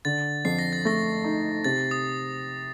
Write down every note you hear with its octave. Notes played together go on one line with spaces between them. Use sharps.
D3 A6
F2 C7
A#6
A6
A3 A#6
D#4
C3 A6
D#6